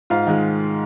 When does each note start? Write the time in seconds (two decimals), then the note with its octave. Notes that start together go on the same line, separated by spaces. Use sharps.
0.10 G#2 F4 F5
0.27 D#3 G#3